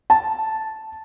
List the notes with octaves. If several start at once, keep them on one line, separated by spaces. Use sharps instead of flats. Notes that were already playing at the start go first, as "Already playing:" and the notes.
A5